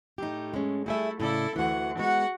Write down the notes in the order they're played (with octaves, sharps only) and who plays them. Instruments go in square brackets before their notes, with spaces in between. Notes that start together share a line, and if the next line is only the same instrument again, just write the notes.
[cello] A2 [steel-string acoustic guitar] D#4 G4
[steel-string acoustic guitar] G#3 C#4
[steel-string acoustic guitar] G3 G#4 E5 [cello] A3 E4
[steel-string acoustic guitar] A2 C#3 D5 [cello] E4 A4
[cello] D2 F#5 [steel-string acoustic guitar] E3 F#4
[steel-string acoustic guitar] G#3 B3 [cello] F#4 F#5